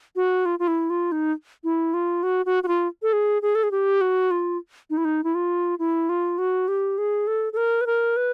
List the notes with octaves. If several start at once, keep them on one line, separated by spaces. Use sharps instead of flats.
F#4
F4
F4
E4
F4
D#4
E4
F4
F#4
F#4
F#4
F4
A4
G#4
G#4
A4
G#4
G4
F#4
F4
D#4
E4
D#4
E4
F4
E4
F4
F#4
G4
G#4
A4
A4
A#4
B4
A#4
B4